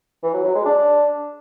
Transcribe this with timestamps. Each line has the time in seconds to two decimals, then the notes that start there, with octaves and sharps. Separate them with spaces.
0.23 E3
0.34 F#3
0.44 F#3
0.55 G#3
0.65 D4